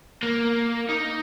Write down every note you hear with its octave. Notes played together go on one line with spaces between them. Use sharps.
A#3
D#4